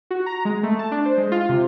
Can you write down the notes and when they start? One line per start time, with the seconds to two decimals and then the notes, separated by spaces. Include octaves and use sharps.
0.11 F#4
0.26 A#5
0.45 G#3
0.63 A3
0.79 A5
0.91 D4
1.05 C5
1.18 G#3
1.32 F4
1.49 C3